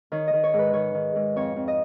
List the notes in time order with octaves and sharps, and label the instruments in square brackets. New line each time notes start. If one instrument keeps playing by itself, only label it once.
[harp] D#3 C#5
D#5
D#3
C#5
G#2
B4
D#3 C#5
D#3
G#2
F2 C#5
F2
D#5